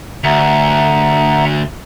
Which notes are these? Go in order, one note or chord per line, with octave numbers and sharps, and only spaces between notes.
D2 E5 F#5 A#5